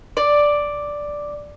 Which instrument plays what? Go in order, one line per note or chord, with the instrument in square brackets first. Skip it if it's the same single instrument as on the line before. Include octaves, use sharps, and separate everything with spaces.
[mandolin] D5